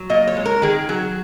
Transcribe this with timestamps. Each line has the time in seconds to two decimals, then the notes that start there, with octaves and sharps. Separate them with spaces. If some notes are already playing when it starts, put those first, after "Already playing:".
Already playing: F#3
0.10 A#2 D#5
0.27 C#5
0.37 G#3
0.45 A#4
0.62 D#3 G#4
0.89 F#3 G#4